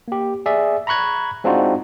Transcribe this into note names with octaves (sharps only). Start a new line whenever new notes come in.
A#3 G4
G#4 D5 E5
A#5 B5 C#6 F#6 G#6
G#3 C4 D4 D#4 F4 F#4